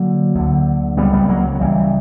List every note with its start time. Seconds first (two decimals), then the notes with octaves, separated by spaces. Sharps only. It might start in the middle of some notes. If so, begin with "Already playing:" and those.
Already playing: D3 F#3 A#3
0.35 D2 D3
0.97 C#2 C#3 G3 B3
1.13 G3 B3
1.25 B3
1.28 F#3 A#3
1.55 F#3
1.60 C#2 C#3 E3 G3